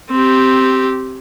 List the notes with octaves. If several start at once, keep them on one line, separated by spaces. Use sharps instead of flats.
C4 G4